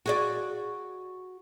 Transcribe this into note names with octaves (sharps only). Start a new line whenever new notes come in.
F#4 G#4 D5